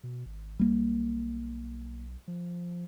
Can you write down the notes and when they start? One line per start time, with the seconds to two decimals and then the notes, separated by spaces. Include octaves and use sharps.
0.03 B2
0.26 G#1
0.59 B1 G3 A#3
2.28 F3